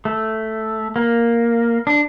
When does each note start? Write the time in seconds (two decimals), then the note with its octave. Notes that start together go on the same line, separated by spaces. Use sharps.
0.05 A3
0.96 A#3
1.87 D4